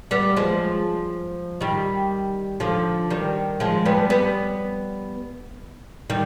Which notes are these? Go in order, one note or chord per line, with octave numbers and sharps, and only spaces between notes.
G3 B3
F3 G#3
D#3 G3
D3 F3
D#3 G3
F3 G#3
G3 B3
G3 B3
D#3 G3